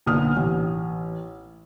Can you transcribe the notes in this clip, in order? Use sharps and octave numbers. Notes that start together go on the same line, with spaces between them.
B1 A#2 D3 D#6 F6
A1